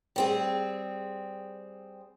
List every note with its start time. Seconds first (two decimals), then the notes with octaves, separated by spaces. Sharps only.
0.16 G3 C4 G#4